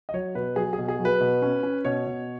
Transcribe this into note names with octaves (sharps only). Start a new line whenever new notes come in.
D#5
F#3 C#5
B2 B4
F#3 G#4
G#4
B2
G#4
F#3
B4
B2
C#4
C#4
B2 C#5
B2